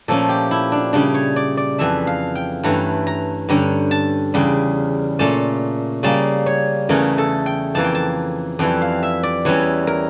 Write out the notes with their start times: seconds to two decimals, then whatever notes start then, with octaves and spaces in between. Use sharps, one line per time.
0.08 A#2 F3 A3 C#4 A4
0.29 G4
0.51 E4
0.72 D4
0.93 C#3 G3 C#4 D4
1.14 C#5
1.36 D5
1.57 D5
1.78 F2 E3 A3 E5
2.07 F5
2.35 G5
2.63 G2 E3 A3 C#4 A#5
3.07 A#5
3.49 G2 D3 G3 C#4 A#5
3.91 A5
4.34 E2 C#3 G3
5.19 A#2 A3 C#4 A5
6.03 C#3 G3 A#3 C#4 A5
6.46 C#5
6.89 E2 C#3 E3 A3 C#4 A#4
7.18 A4
7.46 G5
7.75 F2 E3 A#3 A5
7.84 G5
7.95 A5
8.59 F2 E3 G3 G5
8.81 F5
9.03 E5
9.23 D5
9.45 E2 E3 G3 C#4 C#5
9.87 A#4